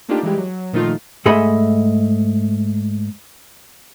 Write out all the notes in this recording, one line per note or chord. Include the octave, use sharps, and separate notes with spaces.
A3 A#3 D4 D#4 F4 G4
E3 G3 G#3 G4
F#3
A#2 D#3 F3 A3 D#4 F4
G#2 A3 G#4 D#5 E5 B5